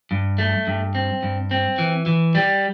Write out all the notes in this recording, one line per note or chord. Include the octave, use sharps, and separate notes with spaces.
G2
A3
G2
C4
G2
C4
E3
E3
G3